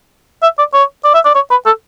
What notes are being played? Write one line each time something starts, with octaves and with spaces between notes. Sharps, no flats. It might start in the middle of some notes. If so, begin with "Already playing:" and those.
E5
D5
C#5
D5
E5
D5
C#5
B4
A4